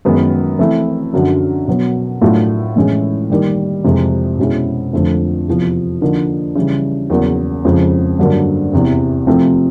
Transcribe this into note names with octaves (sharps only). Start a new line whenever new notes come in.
F#2 D#3 G#3 B3
E3 A3 C4 E4
F#2 D3 F#3
B2 F#3 B3
A2 F#3 A3 D4 F4
A2 E3 G#3 C#4 E4
D#3 G3 A#3 D#4
F2 C3 E3 G#3
B2 G#3 C#4 E4
F2 D3 F3 A3
E2 C3 F3
D3 F3 A#3 D#4
C#3 E3 G3
E2 C#3 F#3 A#3
F2 C#3 F3 G#3
G2 D3 F#3 A#3 D4
E2 C3 E3
C3 F3 A3 C4